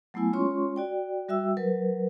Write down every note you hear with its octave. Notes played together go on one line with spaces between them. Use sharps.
F#3 A3 B3 E4 G#5
G#3 C#4 F4 C#5 C6 C#6
F#4 D5 G5
G3 F#4 E5 G5 E6
F#3 A#4 B4